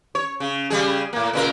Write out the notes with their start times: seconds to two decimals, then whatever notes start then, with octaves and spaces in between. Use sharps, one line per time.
0.15 C#5
0.40 C#3
0.70 C#3 G3 G#4
1.13 A2 A#3
1.33 A#2 C#3 A#4